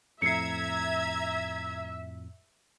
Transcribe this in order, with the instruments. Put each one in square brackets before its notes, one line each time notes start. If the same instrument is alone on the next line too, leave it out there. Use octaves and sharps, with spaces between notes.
[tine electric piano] F2 A2 [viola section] E5 [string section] A#5 G#6 [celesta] C7 C#7